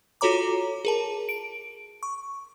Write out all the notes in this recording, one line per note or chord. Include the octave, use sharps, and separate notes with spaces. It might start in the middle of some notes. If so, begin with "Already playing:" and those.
F4 F#4 A4 C#5 A#5 D6
G#4 A#4 A5
D7
C#6